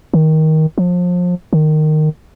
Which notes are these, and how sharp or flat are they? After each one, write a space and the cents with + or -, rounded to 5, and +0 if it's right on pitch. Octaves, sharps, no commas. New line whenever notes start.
D#3 +15
F3 +30
D#3 -15